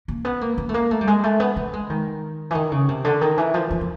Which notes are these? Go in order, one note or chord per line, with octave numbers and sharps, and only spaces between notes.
A#3
B3
A#3
A#3
A3
A#3
A3
G3
G#3
A3
B3
A3
G#3
D#3
E3
D#3
C#3
C3
D3
D#3
E3
F3
F3
F3